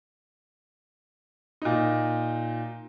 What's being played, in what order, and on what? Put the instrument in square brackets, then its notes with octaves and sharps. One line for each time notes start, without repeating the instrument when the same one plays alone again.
[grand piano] A#2 D#4